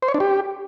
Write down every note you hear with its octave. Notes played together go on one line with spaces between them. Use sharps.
C5
C#5
D4
G4